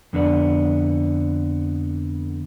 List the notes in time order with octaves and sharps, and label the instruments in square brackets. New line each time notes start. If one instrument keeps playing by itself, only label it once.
[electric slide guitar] F2 D3 B3 D5